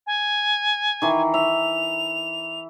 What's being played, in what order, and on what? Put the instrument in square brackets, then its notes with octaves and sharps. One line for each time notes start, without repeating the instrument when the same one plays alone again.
[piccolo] G#5
[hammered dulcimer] D#3 E3
[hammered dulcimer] E5 [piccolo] F7